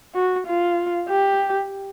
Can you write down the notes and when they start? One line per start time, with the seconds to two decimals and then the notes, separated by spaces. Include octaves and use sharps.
0.14 F#4
0.47 F4
1.09 G4